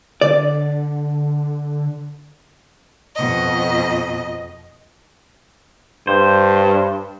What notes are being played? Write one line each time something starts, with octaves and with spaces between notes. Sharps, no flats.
D3 D5
F2 B2 D#5
G2 C5